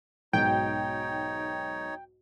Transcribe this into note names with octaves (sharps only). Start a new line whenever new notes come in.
B1 G#2 B2 D#4 C#5 G5